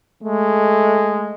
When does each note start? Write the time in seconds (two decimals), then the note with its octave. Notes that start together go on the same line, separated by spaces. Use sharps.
0.23 G#3 A3